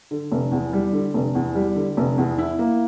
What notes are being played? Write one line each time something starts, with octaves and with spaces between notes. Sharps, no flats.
D3
F1
E2
G3
D3
F1
E2
G3
D3
F1
E2
E4
A#3